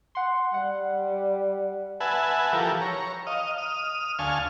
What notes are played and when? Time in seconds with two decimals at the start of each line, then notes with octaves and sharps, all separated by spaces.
0.15 F#5 C6
0.54 G3 F#5
2.00 B4 E5 F#5 G#5 A5
2.53 E3 F3 G4 A4 A#4
2.81 C#5 A#5
3.27 D#5 F5
3.58 D#6 F6
4.19 D2 F5 G#5 A5 C#6 F6